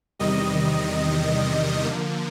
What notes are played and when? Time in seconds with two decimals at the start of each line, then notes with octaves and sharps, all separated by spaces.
0.19 E2 C3 D#3 G3 D#5
1.84 D3 F3 A#3